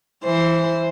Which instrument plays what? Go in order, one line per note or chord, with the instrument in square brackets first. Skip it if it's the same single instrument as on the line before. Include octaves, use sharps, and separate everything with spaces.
[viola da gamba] E3 C5